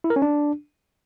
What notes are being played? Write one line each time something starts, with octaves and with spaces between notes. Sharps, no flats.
E4
A#4
C#4
D4